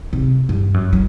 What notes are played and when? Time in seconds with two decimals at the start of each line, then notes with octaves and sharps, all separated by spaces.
0.13 C3
0.49 G2
0.74 F#2
0.93 F#3